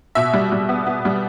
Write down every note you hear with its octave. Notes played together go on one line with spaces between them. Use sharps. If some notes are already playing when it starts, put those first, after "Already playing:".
B2 E5
G3
G3
B3
B3
G3